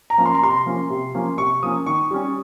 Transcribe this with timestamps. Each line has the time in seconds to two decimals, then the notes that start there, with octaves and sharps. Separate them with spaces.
0.10 A#5
0.18 F3 A#3 C#4
0.26 C6
0.35 A#5
0.42 C3 C6
0.66 F3 A#3 C#4
0.90 C3
1.15 F3 A#3 C#4
1.38 C3 C#6
1.63 F3 A#3 C#4 D#6
1.86 D#3 C#6
2.11 G3 C#4